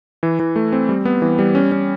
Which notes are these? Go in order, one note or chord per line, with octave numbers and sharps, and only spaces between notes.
E3
E3
A3
C4
G3
B3
E3
G3
C#4
C#4